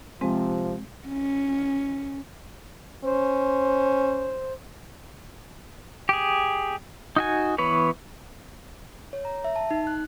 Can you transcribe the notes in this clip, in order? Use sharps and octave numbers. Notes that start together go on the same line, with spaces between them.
C3 F3 G#3 C4
C#4
C#4 C5
G4 G#4
D#4 F#4 G#5
E3 B3 B4 C#5
C#5
A#5
E5
A5
D#4
F#6